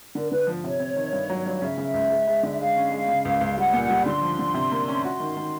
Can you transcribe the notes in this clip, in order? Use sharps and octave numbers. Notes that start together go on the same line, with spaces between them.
D3 A#4
D3 B4
F3
C3 C#5
C4
D#3
G2
F#3
G2
C#3 E5
C#3
C#2
G#3
G#3
D3
G#3 F5
C#4
G#3
C#3
C#2
C#2
G3 F#5
A#2
G3
D3 C6
F3
D3
C3
A#3
C#4
F#4 C6
D#3
D#3